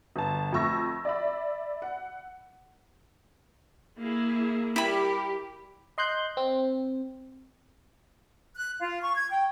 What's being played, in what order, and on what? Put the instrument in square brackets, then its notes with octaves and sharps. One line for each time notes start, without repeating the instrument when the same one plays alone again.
[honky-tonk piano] G1 A5
F2 A3 C#6 E6 A#6
D5 E5 B5
F#5
[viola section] A#3 E4 G#4
[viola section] G3 A#4 [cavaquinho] E4 B5 [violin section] G4
[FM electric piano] D#5 C6 F#6 G6
C4
[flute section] F#6
F4
C#6
G#6
G5